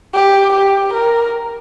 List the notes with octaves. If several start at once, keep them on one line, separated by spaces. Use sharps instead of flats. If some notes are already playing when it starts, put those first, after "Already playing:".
G4
G4
A#4